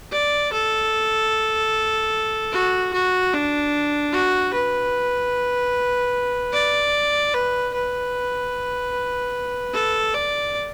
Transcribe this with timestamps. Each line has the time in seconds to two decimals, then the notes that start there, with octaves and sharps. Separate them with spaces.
0.12 D5
0.53 A4
2.52 F#4
2.93 F#4
3.33 D4
4.12 F#4
4.53 B4
6.53 D5
7.34 B4
7.74 B4
9.73 A4
10.15 D5